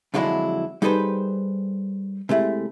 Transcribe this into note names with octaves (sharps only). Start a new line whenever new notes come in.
F2 D3 F#3 G#3 D4 E4
G3 D#4 G#4 A4 B4 C5
C3 G#3 A3 E4